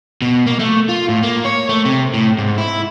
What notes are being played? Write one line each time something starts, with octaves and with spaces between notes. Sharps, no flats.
B2
A#3
A3
F4
A2
A#3
C#5
A3
C3
A2
G#2
E4